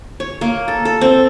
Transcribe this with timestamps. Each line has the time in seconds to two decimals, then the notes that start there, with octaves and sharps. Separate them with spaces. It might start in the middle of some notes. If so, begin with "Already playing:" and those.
0.20 C#5
0.41 A#3
0.68 A4
0.85 A4
1.01 C4